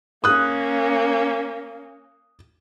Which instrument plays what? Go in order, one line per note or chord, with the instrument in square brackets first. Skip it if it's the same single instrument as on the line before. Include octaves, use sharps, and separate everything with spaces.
[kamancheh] A#3 C#4 [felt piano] D#6 F#6